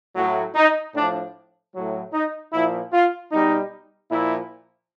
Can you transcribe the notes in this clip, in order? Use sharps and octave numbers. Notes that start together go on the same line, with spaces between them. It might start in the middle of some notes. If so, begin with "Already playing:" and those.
A2 F#3
D#4
A2 F3 D4
A2 F#3
D#4
A#2 F3 E4
F4
B2 G3 D#4
A#2 F3 E4